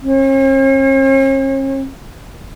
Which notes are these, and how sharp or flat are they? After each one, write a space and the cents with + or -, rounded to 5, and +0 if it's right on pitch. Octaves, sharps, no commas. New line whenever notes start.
C#4 -45